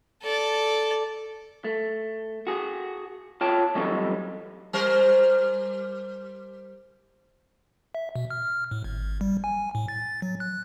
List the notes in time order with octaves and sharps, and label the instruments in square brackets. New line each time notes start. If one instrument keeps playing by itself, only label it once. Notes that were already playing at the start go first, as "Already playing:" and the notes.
[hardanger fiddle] A4 D5
[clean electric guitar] A3
F#4 G#4
F4 C#5 G5 A5
E3 F#3 G3 A3 C4 D#4
[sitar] G3 A#4 C5
[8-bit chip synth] E5
B2
F6
A2
G#1
G3
G#5
A2
A6
F#3
F#6